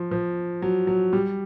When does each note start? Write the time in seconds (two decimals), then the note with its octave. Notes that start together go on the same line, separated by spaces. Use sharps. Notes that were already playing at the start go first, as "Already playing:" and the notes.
Already playing: F3
0.11 F3
0.62 F#3
0.87 F#3
1.13 G3